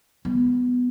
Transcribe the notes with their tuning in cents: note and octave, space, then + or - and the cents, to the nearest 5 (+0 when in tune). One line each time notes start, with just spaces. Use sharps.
G#3 +0 B3 +5